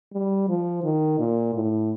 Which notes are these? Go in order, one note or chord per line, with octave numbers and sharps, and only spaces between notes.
G3
F3
D#3
A#2
A2